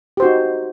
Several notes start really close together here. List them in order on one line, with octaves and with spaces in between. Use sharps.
G4 C5 F#4 D#4